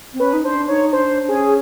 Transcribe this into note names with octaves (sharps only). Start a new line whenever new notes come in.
C4
C#4 B4
D#4
D4 C5
D#4 C#5
D4 C5
D4
C#4 G#4